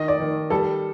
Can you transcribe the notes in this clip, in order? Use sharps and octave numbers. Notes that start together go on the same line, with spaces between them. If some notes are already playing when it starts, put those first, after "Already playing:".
Already playing: D#3 D#5
D5
D#3
G3 A4